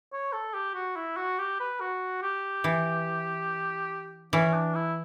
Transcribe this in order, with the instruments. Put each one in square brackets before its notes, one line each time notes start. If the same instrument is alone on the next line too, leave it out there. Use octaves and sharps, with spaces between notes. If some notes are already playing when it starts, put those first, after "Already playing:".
[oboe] C#5
A4
G4
F#4
E4
F#4
G4
B4
F#4
G4
[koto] E3
[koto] E3 [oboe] C#4
[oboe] D4
E4